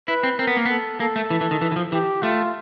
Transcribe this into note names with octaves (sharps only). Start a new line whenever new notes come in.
E4 B4
C4
C4 A#4
B3
A#3
B3 A4
A#3 A4
A3
E3
E3
D#3
E3
E3
F3
E3 G4
A3 F4